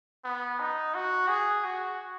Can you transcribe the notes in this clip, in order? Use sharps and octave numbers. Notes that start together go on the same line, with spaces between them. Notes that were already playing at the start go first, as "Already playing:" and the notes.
B3
D#4
F#4
G#4
F#4